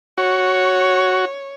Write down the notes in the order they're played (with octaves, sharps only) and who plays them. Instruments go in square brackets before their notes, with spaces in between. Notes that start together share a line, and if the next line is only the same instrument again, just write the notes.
[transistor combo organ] F#4 [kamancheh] C#5